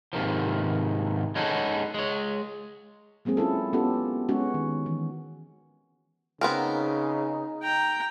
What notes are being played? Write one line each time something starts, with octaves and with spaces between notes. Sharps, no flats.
G#2 C3 D#3 F3
G#3 C#4 D#4 F#4 G#4 A4
G#3 C#5
F#3 G#3 A#3 C4 G#4
C#4 E4 F4 A4
B3 C#4 F4 G4 A4
G#3 B3 C#4 F#4
D#3
E3
C#3 B3 C4 D#4 A#4
G5 A#5